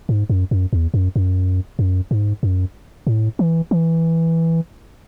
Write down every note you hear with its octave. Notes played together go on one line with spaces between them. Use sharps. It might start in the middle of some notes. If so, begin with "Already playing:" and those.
G#2
F#2
F#2
E2
F#2
F#2
F#2
G#2
F#2
A2
E3
E3